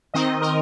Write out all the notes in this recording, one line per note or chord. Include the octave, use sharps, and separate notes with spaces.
D#3 C4 D#4 D#5
A#4 D#5